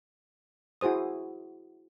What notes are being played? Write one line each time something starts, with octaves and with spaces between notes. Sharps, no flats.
E4 F#4 G#4 C5 D#6